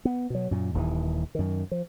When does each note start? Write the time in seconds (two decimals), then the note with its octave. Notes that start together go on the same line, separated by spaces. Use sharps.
0.05 B3
0.30 B2 F#3
0.51 F#2 A#2
0.74 D#1 D#2 D3 E3
1.35 F#2 D#3
1.71 F3